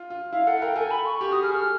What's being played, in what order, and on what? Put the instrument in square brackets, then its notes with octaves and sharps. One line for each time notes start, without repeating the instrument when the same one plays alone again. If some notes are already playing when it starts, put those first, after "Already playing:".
Already playing: [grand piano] F4
F4
[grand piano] E4 [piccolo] F5
[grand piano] A4 [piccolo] F#5
[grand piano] A#4 [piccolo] G5
[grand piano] A4 [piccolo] G#5
[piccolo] B5
C#6
[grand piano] G4
[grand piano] F#4 [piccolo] D#6
[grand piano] G#4 [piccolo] F6
[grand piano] A4 [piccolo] F6